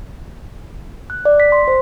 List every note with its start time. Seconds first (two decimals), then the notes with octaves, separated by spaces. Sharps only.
1.10 F#6
1.25 D5
1.40 B6
1.52 C6
1.68 C5